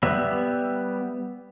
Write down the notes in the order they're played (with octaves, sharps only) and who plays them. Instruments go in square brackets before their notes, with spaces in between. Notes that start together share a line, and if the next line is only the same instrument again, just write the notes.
[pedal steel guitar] G3 B3 E5